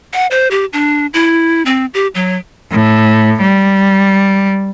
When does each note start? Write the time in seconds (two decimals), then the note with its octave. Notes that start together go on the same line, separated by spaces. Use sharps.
0.13 F#5
0.31 C5
0.51 G4
0.73 D4
1.14 E4
1.66 C4
1.94 G4
2.15 F#3
2.71 A2
3.41 G3